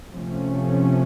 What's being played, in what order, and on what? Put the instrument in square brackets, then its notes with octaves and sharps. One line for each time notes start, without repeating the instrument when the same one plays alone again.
[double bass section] C3 F3 A3 C#4